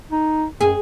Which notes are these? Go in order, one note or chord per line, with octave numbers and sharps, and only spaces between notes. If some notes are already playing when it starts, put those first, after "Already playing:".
D#4
F#2 G#4